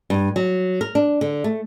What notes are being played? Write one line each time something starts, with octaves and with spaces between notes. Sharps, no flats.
G2
F#3
A#4
D4
D3
A3